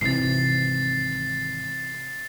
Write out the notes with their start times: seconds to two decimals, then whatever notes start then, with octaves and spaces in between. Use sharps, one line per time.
0.01 G#1 C3 E3 A6 C7